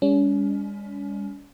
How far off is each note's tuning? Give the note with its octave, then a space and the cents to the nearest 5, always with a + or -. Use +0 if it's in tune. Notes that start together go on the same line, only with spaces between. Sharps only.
G#3 -45 C#4 +35